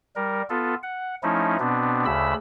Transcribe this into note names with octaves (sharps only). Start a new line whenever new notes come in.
G3 A#4
B3 F4 A4
F#5
F3 A3 C#4 D#4 E4
B2 B3 C4 D4
D2 C#3 B5 E6